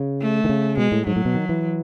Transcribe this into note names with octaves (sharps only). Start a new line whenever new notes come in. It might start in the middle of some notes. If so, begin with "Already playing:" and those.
Already playing: C#3
A3
D#3
C#3
B2 G#3
A2
G#2 F#3
A2
B2
D#3
E3